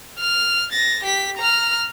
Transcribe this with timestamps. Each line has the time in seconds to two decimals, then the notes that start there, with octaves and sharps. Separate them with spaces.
0.19 F6
0.72 A6 A#6
1.04 G4 B6
1.38 A#5 F6